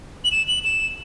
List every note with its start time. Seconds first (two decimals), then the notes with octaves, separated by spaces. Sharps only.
0.24 F#7
0.32 E7
0.48 F#7
0.64 E7